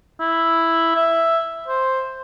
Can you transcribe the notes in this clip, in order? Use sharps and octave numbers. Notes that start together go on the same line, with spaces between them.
E4
E5
C5